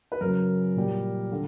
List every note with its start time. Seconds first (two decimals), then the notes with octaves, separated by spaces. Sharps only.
0.12 B4
0.21 F#2 C#3 F#3 A#4
0.76 A#2 G3
1.32 D3